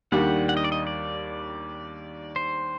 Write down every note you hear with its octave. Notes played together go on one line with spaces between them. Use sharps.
D#2 D#3 G3 D4 G4 F#5
F#5
D#5
D5
D#5
D5
C5